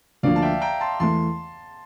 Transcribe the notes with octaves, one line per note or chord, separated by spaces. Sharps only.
D2 D3 F3 A#3 D4 D5 F5
A5
E5 G5
G5 A#5
A5 C6
E2 E3 A3 A5 C6